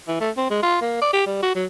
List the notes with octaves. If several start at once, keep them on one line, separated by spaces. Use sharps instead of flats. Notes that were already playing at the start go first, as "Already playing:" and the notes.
E3
A3
C4
G#3
F4
A#3
D5
G4
G3
F#4
F#3